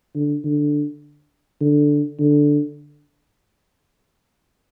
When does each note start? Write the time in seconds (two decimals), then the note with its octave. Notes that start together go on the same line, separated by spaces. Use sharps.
0.15 D3
0.44 D3
1.61 D3
2.19 D3